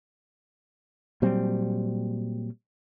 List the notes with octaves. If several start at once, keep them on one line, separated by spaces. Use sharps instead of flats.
A#2 F#3 G3 C4